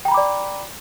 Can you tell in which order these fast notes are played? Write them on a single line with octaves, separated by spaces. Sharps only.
G5 A#5 B5 D6 D5